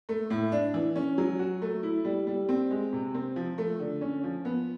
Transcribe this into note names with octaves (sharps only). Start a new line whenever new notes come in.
A3
A2
D4
E3
C#4
F#3
F#4
A3
E4
G3
G3
C4
G#3
C3
C4
F3
A3
D3
C#4
F3
B3